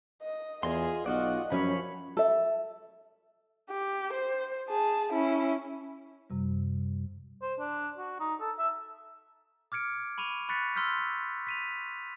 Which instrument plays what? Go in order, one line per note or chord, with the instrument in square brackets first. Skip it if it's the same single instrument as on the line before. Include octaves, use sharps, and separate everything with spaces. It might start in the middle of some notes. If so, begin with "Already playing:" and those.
[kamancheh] D#5
[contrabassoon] E2 [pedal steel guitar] F4 D#5 C6 [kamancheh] G#4 G#5
[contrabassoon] B1 [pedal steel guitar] F4 F#4 D5 [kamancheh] D#5 F#5
[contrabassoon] F#2 [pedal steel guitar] F3 C#4 C#5 [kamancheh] B5
[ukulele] A4 E5
[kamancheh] G4
C5
G#4 A5
C#4 E4
[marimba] F#2 C3 G3
[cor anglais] C5
D4
F#4
D#4
A4
E5
[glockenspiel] D6 F6 G#6 C#7 D7
B5 C#6 D#7 F7
B5 C#6 F#6 A6 B6 C#7
C6 E6 F6 G6 B6
B6 D#7 F7